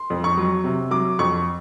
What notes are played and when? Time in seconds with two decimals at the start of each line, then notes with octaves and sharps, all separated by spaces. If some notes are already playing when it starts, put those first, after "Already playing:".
Already playing: C6
0.10 F2
0.24 C#6
0.37 F#3
0.64 C3
0.91 F#3 D6
1.19 F2 C#6